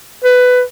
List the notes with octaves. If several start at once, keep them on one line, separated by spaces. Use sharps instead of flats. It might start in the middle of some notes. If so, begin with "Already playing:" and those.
B4